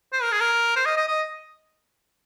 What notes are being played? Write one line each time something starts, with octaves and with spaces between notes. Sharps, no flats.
C5
A#4
G#4
A#4
C5
D#5
D#5
D#5